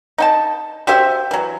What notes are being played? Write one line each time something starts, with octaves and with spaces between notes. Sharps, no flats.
D#4 G5 A5
F#4 G4 C5 E5
E3 F#3